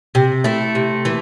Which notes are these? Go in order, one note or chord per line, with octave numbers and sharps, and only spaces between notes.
C3
A3 E4
C3
E3